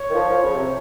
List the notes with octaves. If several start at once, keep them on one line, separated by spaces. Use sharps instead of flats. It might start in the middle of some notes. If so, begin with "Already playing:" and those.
Already playing: C#5
D#3
F3
F3
C#3
C3